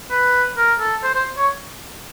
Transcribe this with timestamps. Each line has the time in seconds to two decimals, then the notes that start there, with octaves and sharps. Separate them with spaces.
0.11 B4
0.57 A#4
0.79 A4
1.03 C5
1.14 C5
1.37 C#5